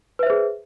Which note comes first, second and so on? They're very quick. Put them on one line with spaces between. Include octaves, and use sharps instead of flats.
B4 E5 C5 G#4